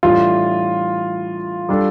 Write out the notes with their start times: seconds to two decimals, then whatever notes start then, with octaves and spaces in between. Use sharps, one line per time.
0.03 A2 E3 G3 D4 F4
1.69 G3 D4 A4